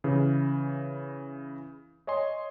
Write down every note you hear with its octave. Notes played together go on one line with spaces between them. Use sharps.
C#3 E3
C#5 D#5 G#5 C6